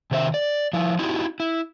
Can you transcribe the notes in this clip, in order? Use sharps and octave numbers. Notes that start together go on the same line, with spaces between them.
C3 D#3 C5 D5 E5
D5
F3 E4
D#4 E4 F#4 G4
E4